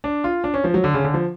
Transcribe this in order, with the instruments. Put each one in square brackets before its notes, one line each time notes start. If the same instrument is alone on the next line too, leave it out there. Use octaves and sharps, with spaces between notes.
[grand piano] D4
F4
D4
C#4
F3
F#3
D3
C#3
D3
F3